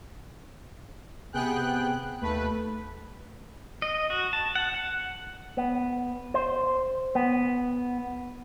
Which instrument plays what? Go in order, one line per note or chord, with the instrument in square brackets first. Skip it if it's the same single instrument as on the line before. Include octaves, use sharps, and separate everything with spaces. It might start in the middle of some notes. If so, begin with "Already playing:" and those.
[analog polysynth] C3 B3 G#4 G5 F#6
D#2 A3 B4
[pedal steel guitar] D#5
F#4
A5
F#5
F#5
[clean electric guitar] B3
C5
B3